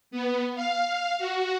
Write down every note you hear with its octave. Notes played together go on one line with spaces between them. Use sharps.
B3
F5
F#4